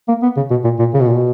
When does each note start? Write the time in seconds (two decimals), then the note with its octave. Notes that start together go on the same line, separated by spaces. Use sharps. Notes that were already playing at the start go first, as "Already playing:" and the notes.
0.08 A#3
0.23 B3
0.36 C#3
0.51 B2
0.64 A#2
0.79 A#2
0.94 C#3
1.01 B2
1.08 A#2
1.14 B2